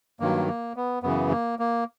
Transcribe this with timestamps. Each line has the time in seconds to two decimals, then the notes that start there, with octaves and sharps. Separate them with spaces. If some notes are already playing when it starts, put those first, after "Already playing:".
0.20 G2 D#3 F#3 A#3
0.48 A#3
0.76 B3
1.03 F#2 C#3 E3 B3
1.31 A#3
1.59 A#3